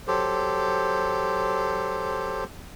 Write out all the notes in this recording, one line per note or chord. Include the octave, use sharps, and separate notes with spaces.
F#3 G4 A4 C5